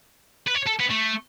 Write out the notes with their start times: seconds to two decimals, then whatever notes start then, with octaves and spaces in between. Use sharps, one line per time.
0.47 B4
0.55 C#5
0.66 A4
0.79 B3
0.90 A3